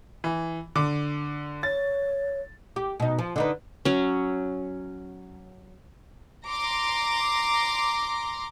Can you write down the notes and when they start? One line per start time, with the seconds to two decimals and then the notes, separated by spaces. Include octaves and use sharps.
0.24 E3
0.76 D3 D6
1.63 C#5 A6
2.76 G4
3.00 B2 D#4
3.19 F3
3.36 D3 D#4 B4
3.85 F#3 C#4
6.47 A#5 C6 D6